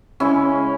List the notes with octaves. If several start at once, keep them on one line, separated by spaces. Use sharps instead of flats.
C#3 G#3 C#4 E4